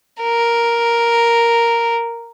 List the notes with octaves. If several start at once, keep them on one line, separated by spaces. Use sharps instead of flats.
A#4